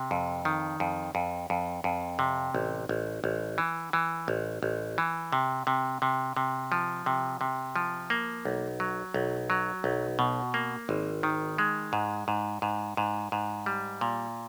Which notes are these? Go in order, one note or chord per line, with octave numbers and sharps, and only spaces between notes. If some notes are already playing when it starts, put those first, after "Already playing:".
Already playing: C3
F2
D#3
F2
F2
F2
F2
C3
A1
A1
A1
E3
E3
A1
A1
E3
C3
C3
C3
C3
F3
C3
C3
F3
A#3
B1
F#3
B1
F#3
B1
B2
A#3
G#1
D#3
G#3
G#2
G#2
G#2
G#2
G#2
G3
A#2